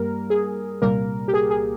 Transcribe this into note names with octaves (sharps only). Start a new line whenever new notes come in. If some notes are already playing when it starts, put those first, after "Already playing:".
Already playing: G2 G3 A#3 A#4
G#4
C2 A#2 G3 A#3 A#4
G4
G#4
G#4